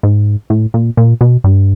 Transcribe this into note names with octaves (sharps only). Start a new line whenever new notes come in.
G#2
A2
A#2
A#2
B2
G2